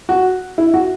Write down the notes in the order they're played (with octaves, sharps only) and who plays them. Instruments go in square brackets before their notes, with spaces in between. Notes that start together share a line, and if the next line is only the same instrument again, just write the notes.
[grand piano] F#4
E4
F#4